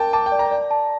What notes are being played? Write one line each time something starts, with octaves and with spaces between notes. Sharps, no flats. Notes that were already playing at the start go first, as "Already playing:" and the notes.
Already playing: A#4 G5 A5 D6
A5 D6
G5
D5
A#5
D5
A5